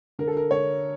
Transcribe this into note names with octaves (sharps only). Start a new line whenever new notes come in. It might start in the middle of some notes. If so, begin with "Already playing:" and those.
D3 A#4
A4
A#4
D3 C#5